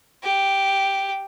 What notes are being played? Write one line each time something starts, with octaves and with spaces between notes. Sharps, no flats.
G4